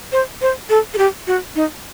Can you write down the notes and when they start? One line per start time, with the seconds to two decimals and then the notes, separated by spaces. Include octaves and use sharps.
0.12 C5
0.41 C5
0.70 A4
0.94 A4
0.98 G4
1.27 F#4
1.55 D#4